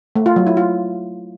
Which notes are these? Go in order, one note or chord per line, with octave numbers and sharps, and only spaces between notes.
A3
F4
F#3
E4
F4